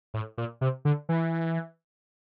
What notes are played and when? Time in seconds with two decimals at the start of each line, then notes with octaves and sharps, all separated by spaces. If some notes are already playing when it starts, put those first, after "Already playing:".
0.14 A2
0.38 A#2
0.61 C3
0.85 D3
1.09 E3